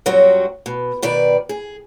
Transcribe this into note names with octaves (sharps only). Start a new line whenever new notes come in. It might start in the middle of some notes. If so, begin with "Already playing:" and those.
F#2 A#2 F#3 G3 C4 F#4
B2
B2 D#3 B4 D5
G#4